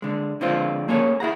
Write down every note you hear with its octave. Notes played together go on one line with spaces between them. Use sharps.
D3 G#3
D3 F3 G#3 C4 F4
A3 A#3 C#4 G#4 A4 C#5
E4 G#4 F#5 A#5